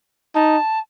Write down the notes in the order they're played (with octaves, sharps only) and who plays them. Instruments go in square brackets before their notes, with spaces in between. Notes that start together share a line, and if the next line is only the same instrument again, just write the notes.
[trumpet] D#4 [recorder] A5